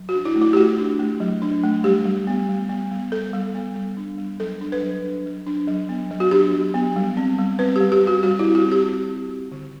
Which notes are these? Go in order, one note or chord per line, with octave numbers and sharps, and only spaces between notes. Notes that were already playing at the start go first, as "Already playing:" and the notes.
Already playing: F#3
F#4
D4
E4
A3
E4
G4
A3 F#4
D4
A3
F#3
D4
A3
G3 G4
G3
B3
G3
B3
G3
B3 A4
G3
B3
G3
D4
G3
F#3 A4
D4
B4
F#3
D4
F#3
D4
F#3
B3
F#3
F#4
D4 G4
F#3
B3
G3
C4
G3
C4 B4
G3 G4
G4
G3
F#4
G3 F#4
E4
C4
F#4
C4
G4
C4
C4
C4
D3